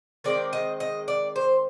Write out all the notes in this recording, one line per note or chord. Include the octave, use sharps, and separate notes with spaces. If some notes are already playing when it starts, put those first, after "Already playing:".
D#3 G#3 C4 D5
D#5
D#5
D5
C5